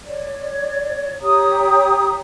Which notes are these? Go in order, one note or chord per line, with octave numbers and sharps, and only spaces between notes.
C#5 D5
G4 C#5 A#5 D#6